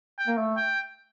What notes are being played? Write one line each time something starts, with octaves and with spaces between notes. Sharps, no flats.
G5
A#3
A3
G5